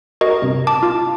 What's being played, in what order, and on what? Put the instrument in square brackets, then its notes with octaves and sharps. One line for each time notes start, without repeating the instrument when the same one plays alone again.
[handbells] F#4 D#5 [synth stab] A#4
[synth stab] G2 C3
[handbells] A5 D6
[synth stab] F4